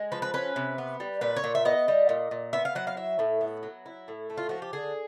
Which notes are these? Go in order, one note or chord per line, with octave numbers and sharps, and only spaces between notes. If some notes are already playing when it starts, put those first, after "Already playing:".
Already playing: G#3
F3 B4
B4
C#4 B4
C3
B3
G3
A#2 B4
C#5
A#2
E5
B3 D#5
G3
A#2
A#2
B3 E5
F5
F#3 F#5
F5
E4 E5
A2
B3
F#3
E4
A2
A3
F4
F3 F#4
G4
D3 G#4